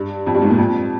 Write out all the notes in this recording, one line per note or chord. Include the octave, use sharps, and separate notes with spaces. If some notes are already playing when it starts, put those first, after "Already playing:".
Already playing: G2
F2
G2
G#2
A#2
F2